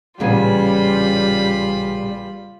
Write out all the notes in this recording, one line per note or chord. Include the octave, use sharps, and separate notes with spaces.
A1 A#2 C#3 G3 B3 F4 G#5 B5